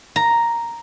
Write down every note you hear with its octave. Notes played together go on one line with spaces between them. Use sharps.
A#5